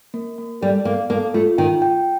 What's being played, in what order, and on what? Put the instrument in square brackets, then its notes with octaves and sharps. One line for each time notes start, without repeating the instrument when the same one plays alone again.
[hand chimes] A#3
A#3
[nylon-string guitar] G3 [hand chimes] A4
[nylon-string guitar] A#3 [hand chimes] F5
[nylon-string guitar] A#3 [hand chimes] A4
[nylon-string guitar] A3 [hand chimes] F4
[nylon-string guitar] D#3 [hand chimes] G5
[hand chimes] G5